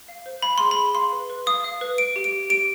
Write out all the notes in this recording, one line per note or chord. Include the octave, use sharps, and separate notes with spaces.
F5
C5
F5 B5
G#4 C6
B5
G#4
F5 C6
B4
B4
F5 D#6
F5
B4
B4 D7
G4
D7
G4
G4 D7